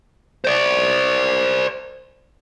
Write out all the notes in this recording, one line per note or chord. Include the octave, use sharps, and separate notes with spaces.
C5 D5